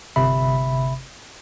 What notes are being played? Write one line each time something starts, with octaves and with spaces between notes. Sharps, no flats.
G1 C3 E5 B5